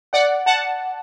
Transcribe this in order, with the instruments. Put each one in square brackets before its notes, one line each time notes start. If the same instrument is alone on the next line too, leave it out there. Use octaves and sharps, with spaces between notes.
[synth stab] D5 F#5
F#5 A5